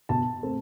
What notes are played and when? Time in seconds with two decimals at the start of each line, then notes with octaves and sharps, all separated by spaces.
0.09 B2 A5
0.43 A3 C4